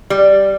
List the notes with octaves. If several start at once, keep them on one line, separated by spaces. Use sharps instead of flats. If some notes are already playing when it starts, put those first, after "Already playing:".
G3